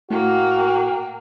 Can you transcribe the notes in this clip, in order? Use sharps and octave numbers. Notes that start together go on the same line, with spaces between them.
A2 A#3 F#4 G5